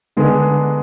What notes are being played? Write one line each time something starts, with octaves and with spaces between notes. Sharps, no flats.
D3 G#3 B3 D4 G#4